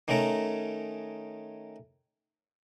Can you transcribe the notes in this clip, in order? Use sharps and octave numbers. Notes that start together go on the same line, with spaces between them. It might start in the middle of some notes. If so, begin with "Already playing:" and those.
D#3 A3 C#4 A#4